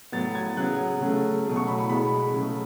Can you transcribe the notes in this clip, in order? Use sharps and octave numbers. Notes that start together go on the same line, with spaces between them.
A2 F#3 B3 A6
G#6
C#3 F#3 B3 F#6
C#3 F#3 A3
B2 F#3 A3
C#6
B5
B5
B2 G#3 B3 B5
C#3 F#3 A3